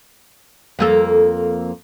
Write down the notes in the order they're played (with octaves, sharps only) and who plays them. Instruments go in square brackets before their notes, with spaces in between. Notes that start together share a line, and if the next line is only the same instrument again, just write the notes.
[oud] F2 A#3 A4